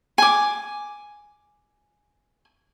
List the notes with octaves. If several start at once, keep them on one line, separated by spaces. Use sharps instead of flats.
G#5 D6